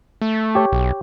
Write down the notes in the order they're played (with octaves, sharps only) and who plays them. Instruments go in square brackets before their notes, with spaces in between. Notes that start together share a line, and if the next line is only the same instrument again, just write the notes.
[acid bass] A3
[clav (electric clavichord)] G4 C#5
[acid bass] B1